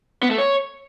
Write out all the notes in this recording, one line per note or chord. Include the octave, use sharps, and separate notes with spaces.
B3
A3
C#5